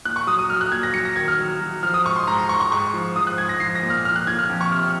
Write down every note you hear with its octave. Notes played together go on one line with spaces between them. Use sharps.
A#2 F#6
C#6
F#3 D#6
D#6
F#3 F6
F#6
A#2 G#6
A#6
F#3 C#7
A#6
D#3 G#6
F6
F#3
F#3
F3 F6
D#6
G#2 C#6
C6
G#2 A#5
C6
G#2 C#6
C#6
G#2 C#6
F3
F3 D#6
F#6
G#2 G#6
A#6
F3 C7
A#6
A#2
F6
F3 F6
F#6
A#2 G#6
F6
F2
C#6
C3 F6
F6